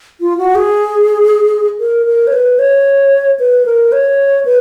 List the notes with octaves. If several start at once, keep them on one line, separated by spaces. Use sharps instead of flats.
F4
F#4
G#4
A#4
A#4
C#5
B4
C#5
B4
A#4
C#5
B4